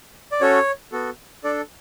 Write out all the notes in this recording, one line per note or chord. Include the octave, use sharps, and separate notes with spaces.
D5
C#4 F#4 A4 C#5
B3 F#4 A4
D4 A4 D5